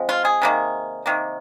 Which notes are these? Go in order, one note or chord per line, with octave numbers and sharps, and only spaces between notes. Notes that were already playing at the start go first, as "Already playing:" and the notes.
Already playing: F3 G#3 C4
F4
G#4
C3 D#3 A#3
C3 D#3 A#3